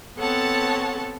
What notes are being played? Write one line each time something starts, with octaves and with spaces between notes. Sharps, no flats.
B3 C4 A4 C#5 F#5 A5